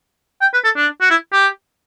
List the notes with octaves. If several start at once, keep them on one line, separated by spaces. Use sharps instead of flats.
G5
B4
A4
D4
F#4
E4
G4